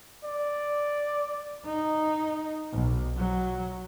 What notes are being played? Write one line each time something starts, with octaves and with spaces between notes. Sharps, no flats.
D5
D#4
B1
F#3